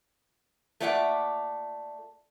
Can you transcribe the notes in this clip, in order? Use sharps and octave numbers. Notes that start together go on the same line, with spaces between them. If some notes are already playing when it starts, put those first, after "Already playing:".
A3 A#3 F4 D5 E5 F#5